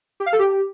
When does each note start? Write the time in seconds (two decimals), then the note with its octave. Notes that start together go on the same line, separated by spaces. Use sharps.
0.20 G4
0.26 F5
0.33 A4
0.39 G4